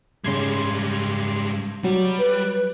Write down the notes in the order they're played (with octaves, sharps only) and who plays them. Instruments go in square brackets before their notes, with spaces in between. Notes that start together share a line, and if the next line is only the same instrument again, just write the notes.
[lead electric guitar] G#2 G3 [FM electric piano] C#3 C6 G#6
[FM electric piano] F#3 [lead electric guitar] G3
[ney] B4